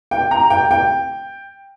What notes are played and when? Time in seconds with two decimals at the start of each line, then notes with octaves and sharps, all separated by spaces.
0.11 G5
0.31 A#5
0.50 G5
0.71 G5